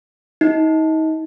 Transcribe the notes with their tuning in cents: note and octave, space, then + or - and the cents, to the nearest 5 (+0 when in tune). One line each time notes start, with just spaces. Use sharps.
D#4 +35